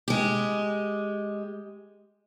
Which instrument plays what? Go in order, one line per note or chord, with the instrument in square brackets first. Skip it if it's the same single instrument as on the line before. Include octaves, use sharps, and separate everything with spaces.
[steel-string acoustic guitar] G#3 G4